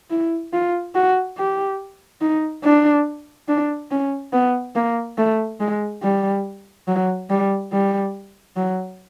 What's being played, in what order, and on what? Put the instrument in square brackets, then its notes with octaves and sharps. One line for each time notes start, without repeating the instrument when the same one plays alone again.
[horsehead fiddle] E4
F4
F#4
G4
D#4
D4
D4
C#4
B3
A#3
A3
G#3
G3
F#3
G3
G3
F#3